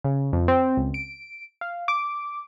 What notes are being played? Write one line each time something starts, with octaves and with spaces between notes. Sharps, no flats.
C#3
F2
C4
C#2
D7
F5
D6